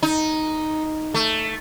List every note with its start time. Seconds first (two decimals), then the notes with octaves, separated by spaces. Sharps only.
0.03 D#4
1.14 A3